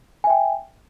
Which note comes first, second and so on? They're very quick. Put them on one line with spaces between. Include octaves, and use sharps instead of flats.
G#5 E5 G5